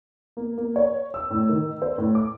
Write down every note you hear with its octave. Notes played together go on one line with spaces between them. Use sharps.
A#3
A#3
C#5
E6
A2
D#3
C5
A2
D6